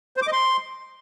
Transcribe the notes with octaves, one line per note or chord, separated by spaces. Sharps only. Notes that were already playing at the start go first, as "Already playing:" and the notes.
C5
D6
D#5
C6